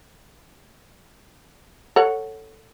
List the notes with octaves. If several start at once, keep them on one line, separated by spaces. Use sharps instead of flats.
A4 C#5 F#5